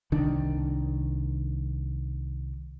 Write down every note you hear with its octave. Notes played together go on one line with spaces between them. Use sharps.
C2 D#3 D4